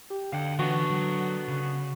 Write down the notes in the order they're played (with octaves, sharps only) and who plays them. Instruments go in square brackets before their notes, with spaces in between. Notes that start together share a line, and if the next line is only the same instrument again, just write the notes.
[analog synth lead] G4
[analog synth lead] D3 [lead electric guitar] F5 G5
[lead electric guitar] E3 [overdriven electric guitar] B3 D4 [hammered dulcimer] F#4
[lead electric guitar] F#3
C#3